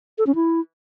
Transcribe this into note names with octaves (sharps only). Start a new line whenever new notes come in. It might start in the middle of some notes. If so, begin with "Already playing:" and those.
A4
C#4
E4